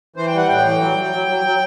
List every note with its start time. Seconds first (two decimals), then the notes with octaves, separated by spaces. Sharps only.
0.16 E3 C5
0.27 G5
0.32 G3
0.37 F#5
0.48 A2 G5
0.65 E3
0.80 F#3
0.97 F#3
1.12 F#3
1.28 F#3
1.44 F#3